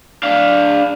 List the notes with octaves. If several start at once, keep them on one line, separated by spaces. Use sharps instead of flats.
D4 F5